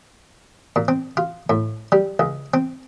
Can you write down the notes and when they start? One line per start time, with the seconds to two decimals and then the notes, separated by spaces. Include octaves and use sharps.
0.76 A#2
0.88 C4
1.17 F4
1.50 A2
1.92 G3
2.19 C#2
2.54 C4